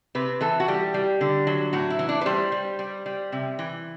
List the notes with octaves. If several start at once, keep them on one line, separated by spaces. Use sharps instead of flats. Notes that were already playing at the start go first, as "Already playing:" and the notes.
C3 B4
E3 A4
F#4
G3 G4
G3
D3
F#3
A2 F#4
E4
E3
D4
B4
G3 C5
G3
G3
G3
C3
E3